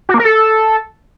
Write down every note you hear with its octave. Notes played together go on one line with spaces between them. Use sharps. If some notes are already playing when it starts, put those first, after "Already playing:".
F#4
A#3
A#4
A4